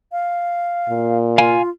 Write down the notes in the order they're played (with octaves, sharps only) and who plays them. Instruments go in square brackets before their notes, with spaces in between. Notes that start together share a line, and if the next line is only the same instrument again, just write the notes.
[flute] F5
[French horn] A#2
[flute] F4 [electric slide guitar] F5 G#5